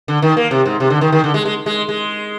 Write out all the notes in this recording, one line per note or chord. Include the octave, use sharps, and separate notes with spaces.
D3
D#3
A#3
C3
G#2
C3
D3
D#3
D#3
D3
G#3
G#3
G#3
G#3